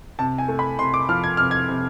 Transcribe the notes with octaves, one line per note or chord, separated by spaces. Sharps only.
C3 A5
G#5
A3
B5
C3 C6
D6
F3 F6
G#6
C3 F6
G#6
C3